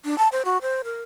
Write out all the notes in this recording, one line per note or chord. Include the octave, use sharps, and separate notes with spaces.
D4
A5
C5
F#4
C5
A#4